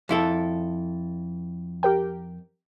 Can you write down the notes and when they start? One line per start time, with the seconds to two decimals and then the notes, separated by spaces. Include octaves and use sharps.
0.09 F2 E4 A4
1.83 G4 A#4 G5